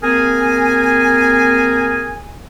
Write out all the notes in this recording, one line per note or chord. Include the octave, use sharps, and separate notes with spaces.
A#3 C4 G#4 A#4 G#5